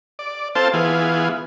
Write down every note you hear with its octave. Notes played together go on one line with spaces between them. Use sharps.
D5
C4 F4 A4 C5 A5
E3 B3 F4 G#4